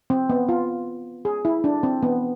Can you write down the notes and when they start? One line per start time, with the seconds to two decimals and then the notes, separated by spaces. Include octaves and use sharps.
0.10 C4
0.30 B3
0.49 F4
1.25 G#4
1.45 E4
1.64 D4
1.83 C4
2.03 B3